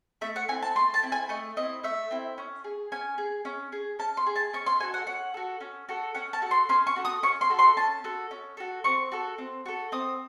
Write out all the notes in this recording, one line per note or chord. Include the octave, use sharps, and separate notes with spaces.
A3 E5
F#5
C4 E4 G#5
A5
A3 C6
A5
C4 E4
G#5
A3 D#5
C4 E4 D#5
A3 E5
C4 E4
C#4
G#4
C#4 G#5
G#4
C#4
G#4
C#4 A5
C6
G#4
A5
C#4 C#6
C6
F#4 A4 G#5
F#5
C#4 F#5
F#4 A4
C#4
F#4 A4
C#4 F#5
A5
F#4 A4
C6
C#4 C6
C#6
F#4 A4
D#6
C#4 C#6
C6
F#4 A4
C6
C#4 A5
F#4 A4
C#4
F#4 A4
C4 C#6
F#4 A4
C4
F#4 A4
C4 D#6